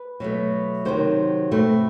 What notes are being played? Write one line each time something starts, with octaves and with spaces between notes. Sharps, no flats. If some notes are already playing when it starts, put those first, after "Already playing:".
Already playing: B4
B2 F#3 A3
C3 D#3 F#3 C5
B2 A3 C4